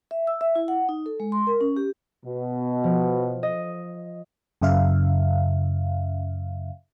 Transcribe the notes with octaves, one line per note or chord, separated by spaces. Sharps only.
E5
E6
E5
E4
F#5
D#4
A4
G#3
C6
A#4
C#4
G4
B2
F3
D#5
F#2 C#3 E5 F5